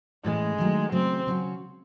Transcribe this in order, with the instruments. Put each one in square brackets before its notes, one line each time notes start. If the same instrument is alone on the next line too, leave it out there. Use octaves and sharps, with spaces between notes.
[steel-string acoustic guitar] A2 E3 A3 C#4 [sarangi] G#3
[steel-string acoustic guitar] D#3 F#3 A3
[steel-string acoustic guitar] C#3 F#3 A3 [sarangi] C4
[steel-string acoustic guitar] C#3 F#3 C#4 F#4